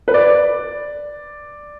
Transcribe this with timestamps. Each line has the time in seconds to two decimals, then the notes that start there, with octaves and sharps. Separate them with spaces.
0.08 B4
0.14 D5